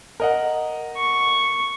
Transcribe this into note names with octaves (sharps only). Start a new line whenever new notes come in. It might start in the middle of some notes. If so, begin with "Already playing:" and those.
A#4 D#5 F#5
C#6